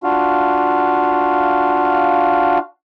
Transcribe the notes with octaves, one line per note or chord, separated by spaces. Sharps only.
D4 F4 F#4 F5